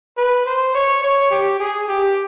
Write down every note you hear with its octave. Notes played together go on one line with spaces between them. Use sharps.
B4
C5
C#5
C#5
G4
G#4
G4